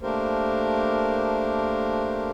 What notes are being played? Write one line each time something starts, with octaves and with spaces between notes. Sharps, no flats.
A3 A#3 D4 G4 A#4 C5